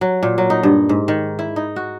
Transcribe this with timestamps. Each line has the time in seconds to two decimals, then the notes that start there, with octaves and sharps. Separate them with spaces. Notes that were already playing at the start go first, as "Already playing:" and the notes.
0.01 F#3
0.23 A#2
0.38 F#3
0.50 D#4
0.63 G2
0.89 G#2
1.08 D#3
1.39 E4
1.56 D#4
1.76 F#4